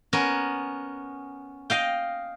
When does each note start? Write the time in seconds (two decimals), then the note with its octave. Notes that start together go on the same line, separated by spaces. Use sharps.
0.13 B3 C#4 A#4
1.70 D#5 F5 G5